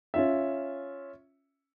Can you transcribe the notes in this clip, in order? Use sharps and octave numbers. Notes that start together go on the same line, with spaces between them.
C#4 F4 E5